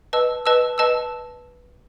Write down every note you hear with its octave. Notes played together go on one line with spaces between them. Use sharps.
B4 D#5 A5 E6
B4 D#5 A5 E6
B4 D#5 A5 E6